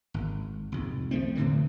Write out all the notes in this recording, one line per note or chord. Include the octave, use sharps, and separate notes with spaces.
G#1
C2 F2 G#2
F3 G#3 A3 C4
A2 D3 E3 G3